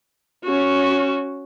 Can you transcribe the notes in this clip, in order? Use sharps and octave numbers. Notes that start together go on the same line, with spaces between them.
C#4 F#4